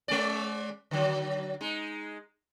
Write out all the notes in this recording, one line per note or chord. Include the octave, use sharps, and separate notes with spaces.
G#3 C#4 D5
D3 F#3
G#3 D#4